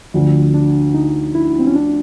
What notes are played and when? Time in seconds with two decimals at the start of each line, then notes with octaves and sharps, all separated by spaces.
0.14 D2 D3 F3
0.54 D4
0.94 D#4
1.35 E4
1.59 C4
1.67 C#4
1.76 D4